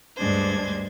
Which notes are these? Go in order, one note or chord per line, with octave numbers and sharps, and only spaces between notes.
D2 G2 G#3 D4 C5 G#6